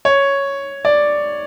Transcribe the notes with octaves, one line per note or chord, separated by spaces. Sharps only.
C#5
D5